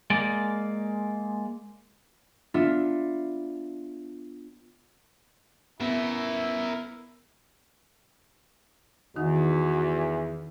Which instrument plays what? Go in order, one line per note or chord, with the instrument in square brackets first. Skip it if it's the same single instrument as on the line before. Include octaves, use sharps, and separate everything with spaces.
[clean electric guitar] G#3 A#3 D5
[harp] B3 D4 F4 E5
[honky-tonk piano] B3 [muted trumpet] E4 [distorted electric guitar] A#4 E5
[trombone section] E2 [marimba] D#3 D#4 [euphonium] F#4